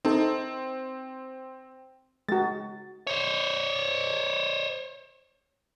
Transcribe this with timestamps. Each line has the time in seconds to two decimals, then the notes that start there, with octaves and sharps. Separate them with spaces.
0.05 C4 D#4 A4
2.29 G#3 F#4 A6
3.07 C5 C#5